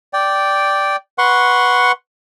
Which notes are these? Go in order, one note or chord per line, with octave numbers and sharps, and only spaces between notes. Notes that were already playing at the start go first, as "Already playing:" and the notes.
D5 G5
B4 F#5 C6 C#6